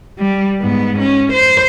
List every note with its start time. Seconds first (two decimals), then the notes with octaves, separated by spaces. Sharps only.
0.19 G3
0.62 G#2 B3
0.99 C#4
1.33 C5